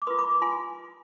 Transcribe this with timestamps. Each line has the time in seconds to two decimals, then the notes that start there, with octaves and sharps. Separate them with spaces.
0.02 D6
0.07 F4 B4 C6 D#6
0.19 B5 D6
0.42 F4 G#5 C6